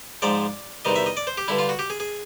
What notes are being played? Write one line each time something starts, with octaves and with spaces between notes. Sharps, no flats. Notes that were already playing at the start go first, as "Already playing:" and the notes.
G#2 F3 G#3 D5
E2 C3 D#3 G3 D#5
E5
D#5
D5
C5
G4
G2 D3 G3 E4
F4
F#4
G4
G#4
G#4